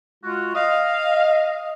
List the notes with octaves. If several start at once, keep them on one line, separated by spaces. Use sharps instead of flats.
G#3 F4 F#4
D#5 F5